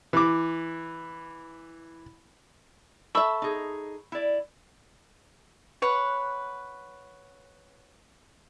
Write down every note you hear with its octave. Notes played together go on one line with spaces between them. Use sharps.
E3 D6
A4 E5 B5 C#6 E6
D#4 G#4
E4 D5
B4 C#5 F#5